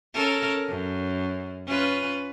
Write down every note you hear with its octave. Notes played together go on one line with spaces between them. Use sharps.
C#4 A4 A#4
F#2
C#4 F4 B4